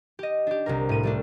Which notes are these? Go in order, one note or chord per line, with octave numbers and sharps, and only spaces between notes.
G4 D#5
D4 G4
C2 C3 A#4
A2 D#7
G3 A3 D4